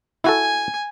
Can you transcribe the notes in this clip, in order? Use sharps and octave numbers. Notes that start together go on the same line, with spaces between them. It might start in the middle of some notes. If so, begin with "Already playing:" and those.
E4 F#4 A4 G#5